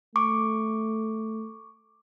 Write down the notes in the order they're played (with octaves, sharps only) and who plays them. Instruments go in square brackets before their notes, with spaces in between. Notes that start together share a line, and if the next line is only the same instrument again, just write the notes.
[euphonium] A3 [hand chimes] C#6 D6